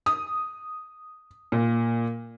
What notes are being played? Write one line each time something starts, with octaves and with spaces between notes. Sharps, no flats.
D#6
A#2